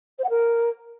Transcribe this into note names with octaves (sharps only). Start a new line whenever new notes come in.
C5
F#5
A#4